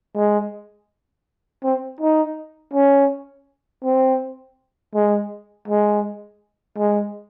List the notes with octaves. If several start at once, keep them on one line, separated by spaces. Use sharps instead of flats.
G#3
C4
D#4
C#4
C4
G#3
G#3
G#3